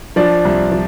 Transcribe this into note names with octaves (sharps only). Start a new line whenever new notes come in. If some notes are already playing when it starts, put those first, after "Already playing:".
F3 D4
C2
F3